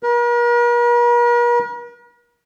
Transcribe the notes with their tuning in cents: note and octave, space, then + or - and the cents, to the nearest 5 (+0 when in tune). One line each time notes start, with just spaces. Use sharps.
A#4 +45